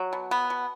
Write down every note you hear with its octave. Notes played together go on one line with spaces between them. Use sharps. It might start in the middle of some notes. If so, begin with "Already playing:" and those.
Already playing: F#3
B2
B3
B2